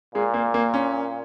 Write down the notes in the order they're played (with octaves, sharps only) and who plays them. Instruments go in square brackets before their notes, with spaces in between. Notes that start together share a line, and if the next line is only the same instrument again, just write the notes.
[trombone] A#2 [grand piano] G#3
[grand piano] A#3
A#3
C#4